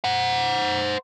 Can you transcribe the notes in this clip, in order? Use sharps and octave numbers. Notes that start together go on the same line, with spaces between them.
C5 F#5